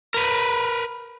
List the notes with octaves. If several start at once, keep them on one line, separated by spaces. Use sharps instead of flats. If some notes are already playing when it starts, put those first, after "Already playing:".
A#4 B4